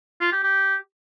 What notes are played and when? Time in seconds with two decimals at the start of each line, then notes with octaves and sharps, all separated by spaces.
0.21 F4
0.32 G4
0.43 G4